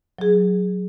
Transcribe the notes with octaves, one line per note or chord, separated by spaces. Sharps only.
F#3 G#4